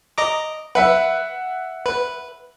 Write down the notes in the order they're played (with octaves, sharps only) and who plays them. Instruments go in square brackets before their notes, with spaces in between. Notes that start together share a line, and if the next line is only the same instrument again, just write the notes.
[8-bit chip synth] D#5 A#5 D6
[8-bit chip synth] B4 [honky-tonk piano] E5 F#5
[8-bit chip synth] B4